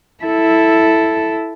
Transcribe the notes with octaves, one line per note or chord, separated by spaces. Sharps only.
E4 A4